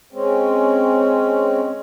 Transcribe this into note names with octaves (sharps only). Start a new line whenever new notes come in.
G#3 C4 C#4